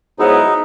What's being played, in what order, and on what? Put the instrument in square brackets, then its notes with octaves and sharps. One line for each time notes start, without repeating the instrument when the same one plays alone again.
[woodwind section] G#2 F#3 B3 E4 [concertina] D#4